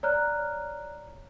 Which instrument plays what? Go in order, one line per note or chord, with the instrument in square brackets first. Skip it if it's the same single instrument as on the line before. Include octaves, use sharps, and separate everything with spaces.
[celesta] C#5 D5 A#5 F6 F#6